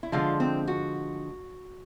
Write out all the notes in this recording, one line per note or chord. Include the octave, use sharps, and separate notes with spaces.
E4
D3 F3 G#3 F4
C4
F#4